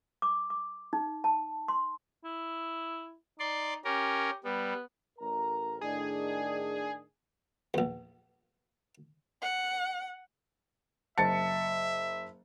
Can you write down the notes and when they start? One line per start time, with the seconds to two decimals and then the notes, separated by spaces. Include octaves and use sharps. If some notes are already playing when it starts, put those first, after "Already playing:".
0.22 D6
0.50 D6
0.93 D#4
1.24 A5
1.68 C6
2.24 E4
3.40 D#4 D5 C6
3.85 C#4 G4 A#4
4.44 G3 B3
5.18 A1 A#4 A#5
5.81 A2 D#3 D4 G#4
7.74 A#1 E2
9.42 F#5
11.18 F#1 E5 A5 A6 C#7